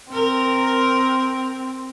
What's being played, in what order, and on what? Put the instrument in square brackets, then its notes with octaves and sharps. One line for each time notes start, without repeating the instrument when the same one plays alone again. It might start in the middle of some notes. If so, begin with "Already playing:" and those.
[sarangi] C4 [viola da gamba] A#4